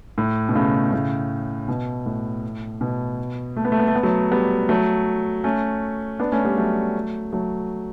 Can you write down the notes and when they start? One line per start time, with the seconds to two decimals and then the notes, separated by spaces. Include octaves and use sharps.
0.18 A2
0.49 B2
0.55 A2 C#3
0.93 A2 C#3
1.68 B2
2.06 A2
2.81 B2
3.56 A3
3.65 B3
3.72 A3
3.79 B3
3.88 A3
3.96 B3
4.03 F#3 A3
4.31 G3 B3
4.69 F#3 A3
5.44 A3 C#4
6.19 B3 D4
6.32 A3 C#4
6.45 G3 B3
6.57 F#3 A3
7.33 F#3 A3